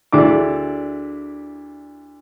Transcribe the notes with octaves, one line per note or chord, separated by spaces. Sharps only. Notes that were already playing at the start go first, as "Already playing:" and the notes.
D2 D4 E4 G#4 D6